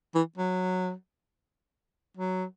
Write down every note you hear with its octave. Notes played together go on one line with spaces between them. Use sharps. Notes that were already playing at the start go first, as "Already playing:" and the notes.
E3
F#3
F#3